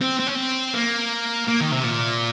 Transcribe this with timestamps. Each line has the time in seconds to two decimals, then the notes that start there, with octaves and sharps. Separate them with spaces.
0.01 C4
0.20 C4
0.27 C#4
0.35 C4
0.74 A#3
1.47 A#3
1.61 D#3
1.72 C3
1.84 A#2